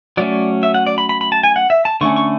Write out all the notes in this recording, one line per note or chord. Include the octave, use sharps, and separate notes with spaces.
F#3 A3 C#4 D5
E5
F#5
D5
B5
B5
B5
A5
G#5
F#5
E5
A5
D3 A3 C#4 C#6
C#6